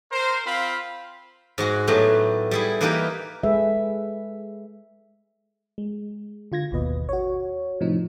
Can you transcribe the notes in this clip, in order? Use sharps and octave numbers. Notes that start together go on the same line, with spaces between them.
A#4 C5
C4 F4 F5 B5
G#2 G#3 F#4 F#5
A2 F#3 A3 B3 G4
G3 E4 G#4
E3 A#3 D#4 G4 A#4 B4
G#3 G#4 A4 B4 E5
G#3
D3 F4 G#6 A#6
G#1 D#2 B2 B4 D#5
F#4 C#5
A2 C3 F3 D#4